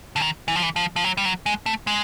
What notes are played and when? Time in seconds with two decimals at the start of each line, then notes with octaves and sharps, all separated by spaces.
0.16 D3
0.20 D#3
0.48 E3
0.56 F3
0.63 E3
0.76 F3
0.96 F3
1.04 F#3
1.17 G3
1.25 F#3
1.46 G#3
1.66 A3
1.87 G#3